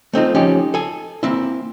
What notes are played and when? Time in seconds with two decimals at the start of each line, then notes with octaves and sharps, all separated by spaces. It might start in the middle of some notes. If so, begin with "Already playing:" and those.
0.13 A3 C4 D#4 F4
0.35 F3 C#4 D#4 G4
0.74 A4 G#5
1.23 A#3 C4 E4